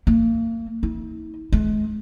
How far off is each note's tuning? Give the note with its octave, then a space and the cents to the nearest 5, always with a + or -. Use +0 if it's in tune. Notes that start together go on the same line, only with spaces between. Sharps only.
A#3 -35
D#4 +45
G#3 +40